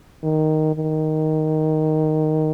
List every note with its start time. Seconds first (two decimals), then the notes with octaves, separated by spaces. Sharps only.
0.23 D#3
0.75 D#3